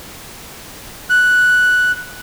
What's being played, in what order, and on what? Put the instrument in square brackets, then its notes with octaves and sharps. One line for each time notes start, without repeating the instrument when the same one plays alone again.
[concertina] F#6